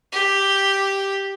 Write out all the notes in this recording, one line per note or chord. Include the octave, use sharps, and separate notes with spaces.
G4